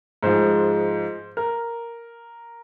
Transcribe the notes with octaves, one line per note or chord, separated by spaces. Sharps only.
G#2 F3 G#3 C5
A#4